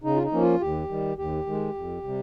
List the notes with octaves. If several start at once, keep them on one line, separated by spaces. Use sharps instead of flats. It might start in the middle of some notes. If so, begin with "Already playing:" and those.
C#3 D#4
F4
D#4
F3 A#3 C#4
F4
D#2 G4
D#3 G3
D#2 G4
D#3 G#3
F2
C3 G3